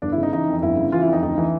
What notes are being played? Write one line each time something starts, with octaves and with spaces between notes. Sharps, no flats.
G1 D4
E4
C#3
D#4
E3 D#4
F2
G1 E4
C#3
E3 F4
E4
F2 D#4
D2 D#4
E3